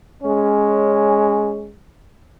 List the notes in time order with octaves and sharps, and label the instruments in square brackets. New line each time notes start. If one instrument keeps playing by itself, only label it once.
[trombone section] G#3 C#4